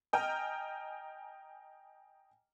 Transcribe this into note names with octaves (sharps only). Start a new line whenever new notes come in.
D#5 G5 G#5 A#5 F6